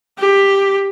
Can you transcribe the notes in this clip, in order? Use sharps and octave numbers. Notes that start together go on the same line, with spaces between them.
G4